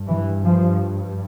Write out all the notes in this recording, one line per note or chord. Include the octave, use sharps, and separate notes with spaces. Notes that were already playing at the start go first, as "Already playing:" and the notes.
Already playing: G2
E3
F3